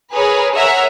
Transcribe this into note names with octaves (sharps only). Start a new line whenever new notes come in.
G#4 A#4 B4 C#5
A#4 C#5 E5 F#5 G#5 A#5